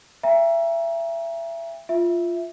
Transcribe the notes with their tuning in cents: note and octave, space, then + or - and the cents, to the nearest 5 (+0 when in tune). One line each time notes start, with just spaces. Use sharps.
E5 +25 G5 +35 A#5 +20
F4 -5 E5 +0